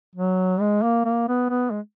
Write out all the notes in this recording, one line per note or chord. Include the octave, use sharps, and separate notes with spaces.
F#3
G#3
A#3
A#3
B3
B3
G#3